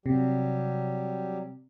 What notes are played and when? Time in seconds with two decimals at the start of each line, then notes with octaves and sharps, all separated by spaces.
0.06 C3 F#3 G3 G4